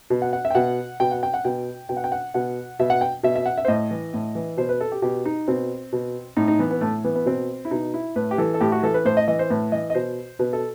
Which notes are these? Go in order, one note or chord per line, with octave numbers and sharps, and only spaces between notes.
B2
F#5
F#5
E5
G5
B2 F#5
B2 G5
F#5
G5
F#5
B2 G5
B2 G5
F#5
G5
F#5
B2 F#5
B2 E5
F#5
G5
B2 E5
E5
F#5
E5
C5
A2 D#5
E3
A2
E3
B2 C5
B4
A4
G4
B2 G4
D#4
B2 C4
B2
A2 D#4
D#4
E3 B3
B3
A2 A3
E3 B3
B3
B2 C4
E4
B2 D#4
E4
A2 B4
G4
E3 A4
A4
A2 G4
F#4
E3 A4
B4
A2 C5
D#5
E3 D#5
C5
A2 B4
E3 D#5
D#5
B2 C5
B2 B4
A4